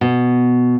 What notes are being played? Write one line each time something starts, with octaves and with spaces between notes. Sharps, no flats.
B2